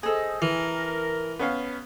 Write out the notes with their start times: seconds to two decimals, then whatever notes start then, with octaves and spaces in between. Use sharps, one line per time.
0.03 G#4 A4 C5 D#5
0.42 E3 A#4
1.39 B3 C#4 F5